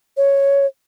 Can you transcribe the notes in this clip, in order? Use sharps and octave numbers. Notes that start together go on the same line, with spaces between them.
C#5